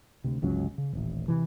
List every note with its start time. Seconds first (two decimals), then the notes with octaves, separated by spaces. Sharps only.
0.24 D2 C3
0.42 G1 C#2 F#3 C#4
0.78 C#3
0.93 D#1 A1
1.28 C3 E3